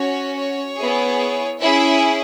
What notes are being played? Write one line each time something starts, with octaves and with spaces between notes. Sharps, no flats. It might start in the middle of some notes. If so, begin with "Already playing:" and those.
Already playing: C#4 F#4 C#5
C#5
B3 E4 G#4
C#4 E4 G#4 E5